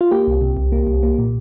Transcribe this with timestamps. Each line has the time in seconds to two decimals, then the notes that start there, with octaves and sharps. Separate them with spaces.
0.01 F4
0.11 A#3 G4
0.27 C2
0.41 C3
0.57 C2
0.72 A#3
0.87 C2
1.03 A#3
1.18 A#2